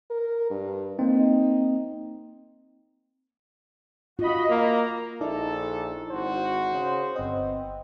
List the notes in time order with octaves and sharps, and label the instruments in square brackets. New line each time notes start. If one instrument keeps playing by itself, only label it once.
[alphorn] A#4
G2
[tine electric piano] A#3 C4 [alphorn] D#4
[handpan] F4 [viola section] F#4 D#5 B5
[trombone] A#3 [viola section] A#5
[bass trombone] A#1 [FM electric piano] D#4 E4 D5 [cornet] A4
[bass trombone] G#1 [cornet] F#4 [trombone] C5
[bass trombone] C#3
[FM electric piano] G1 D#5 [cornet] B3 [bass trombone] C4